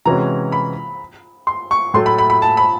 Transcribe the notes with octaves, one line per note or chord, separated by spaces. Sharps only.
C3 E3 G#3 C#4 F#4 A#5
B5
C6
C#6
A2 F#3 A3 C6
B5
B5
B5
A5
B5